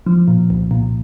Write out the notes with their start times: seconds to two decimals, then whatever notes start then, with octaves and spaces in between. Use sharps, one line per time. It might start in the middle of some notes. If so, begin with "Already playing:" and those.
0.06 F3
0.28 A#2
0.50 C2
0.71 A#2